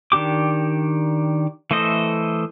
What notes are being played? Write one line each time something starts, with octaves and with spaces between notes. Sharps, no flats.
D#3 D4 G4 D6
E3 A3 A4 C5 D#5